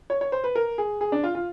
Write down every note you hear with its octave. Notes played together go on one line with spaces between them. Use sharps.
C#5
C#5
C5
B4
A#4
G#4
G#4
D4
F4
F4